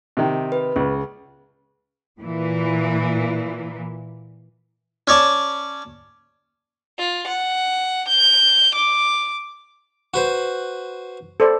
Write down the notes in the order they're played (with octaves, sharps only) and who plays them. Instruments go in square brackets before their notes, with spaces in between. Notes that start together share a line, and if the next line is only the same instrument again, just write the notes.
[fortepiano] C3 D#3
[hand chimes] B4
[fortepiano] C#2 [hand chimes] G#4
[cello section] A#2 E3
[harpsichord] C#4 C#5 D5 A5
[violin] F4
F#5
G6
D6
[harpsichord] F#4 B4 C5
[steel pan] A4 C5 D5